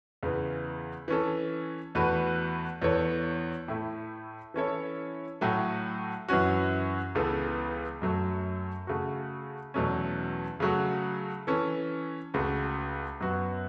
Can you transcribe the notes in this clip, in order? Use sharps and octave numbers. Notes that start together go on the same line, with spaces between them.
E2 C#3 E3
E3 C#4 A4
E2 E3 A3 F#4 B4
E2 E3 B3 A4 C#5
A2 A3 E4
E3 C#4 E4 A4 C#5
A2 F#3 A3 F#4
F#2 E3 C#4 F#4
C#2 C#3 E3 B3 A4
F#2 F#3 A3
C#3 A3 F#4
E2 B2 F#3 A3 C#4
C#3 F#3 A3 F#4
E3 C#4 A4
C#2 C#3 A3 F#4
F#2 F#3 B3 F#4